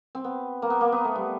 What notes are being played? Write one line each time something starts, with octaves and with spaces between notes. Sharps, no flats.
C4
B3
A#3
B3
A#3
B3
A3
G3